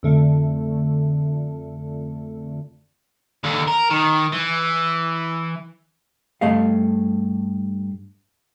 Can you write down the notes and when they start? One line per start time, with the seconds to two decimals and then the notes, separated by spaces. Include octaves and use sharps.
0.03 F2 D3 A3
3.44 D#2 D3
3.68 A#4
3.91 D#3
4.33 E3
6.41 G2 A3 D#5 F5